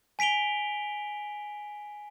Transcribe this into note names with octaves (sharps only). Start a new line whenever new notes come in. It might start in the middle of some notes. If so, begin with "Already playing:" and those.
G#5 B6 D7 F7 G7